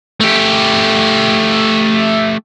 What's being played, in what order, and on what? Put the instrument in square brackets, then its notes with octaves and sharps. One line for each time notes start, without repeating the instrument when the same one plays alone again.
[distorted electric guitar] A3 G4